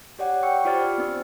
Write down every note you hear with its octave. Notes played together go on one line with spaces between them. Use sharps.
G4 C#5 D5 F#5
G5 C#6 E6 C#7
F4 G4 C5 D5 F6 A6
B3 C4 D4